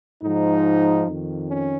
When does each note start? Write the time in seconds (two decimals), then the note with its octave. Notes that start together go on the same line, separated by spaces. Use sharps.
0.24 G#2 F3 D#4
1.07 F2 D#3
1.50 C#4